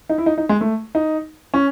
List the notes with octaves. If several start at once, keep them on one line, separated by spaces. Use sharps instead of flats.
D#4
E4
D#4
D#4
G#3
A3
D#4
C#4